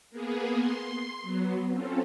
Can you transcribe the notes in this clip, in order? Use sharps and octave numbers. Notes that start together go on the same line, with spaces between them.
A#3 B3 G#4
C6
F#3 B3
C4 C#4 F4 A4